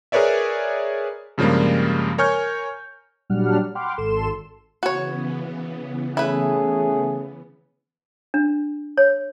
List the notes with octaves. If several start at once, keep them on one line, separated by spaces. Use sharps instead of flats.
G#4 A#4 B4 C#5 D5 E5
G2 C#3 F3 G3 G#3 A#3
A#4 C#5 G#5 C#6 F6 G6
A#2 F#3 G3 D4 F#5 F6
F#5 G5 B5 C6 D6 F6
G#1 A4 C6 E7
C#3 E3 B3 F#4 C#5
A3 C#4 E4 G#4 B4
D4
C#5